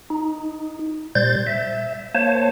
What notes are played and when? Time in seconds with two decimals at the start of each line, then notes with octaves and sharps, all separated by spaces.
0.10 D#4
1.15 A#2 G3 C5 G6 A6
1.47 E5
2.15 A#3 C5 C#5 A5